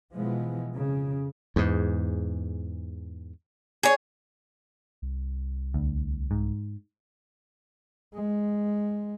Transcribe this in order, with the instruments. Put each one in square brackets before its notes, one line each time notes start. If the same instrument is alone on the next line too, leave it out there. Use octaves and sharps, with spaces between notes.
[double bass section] B2 E3 F3 G#3 B3
F2 C#3
[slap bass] E2 G#2
[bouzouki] G#4 C#5
[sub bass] C2
[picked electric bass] D2
G#2
[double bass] G#3